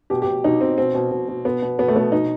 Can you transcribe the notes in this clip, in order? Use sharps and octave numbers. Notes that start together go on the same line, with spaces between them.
B2 G4
B2 G4
B2 D#4
B2 C4
B2 C4
B2
B2
B2
B2 B3
B2
B2 B3
A3
B2 B3
B2 D#4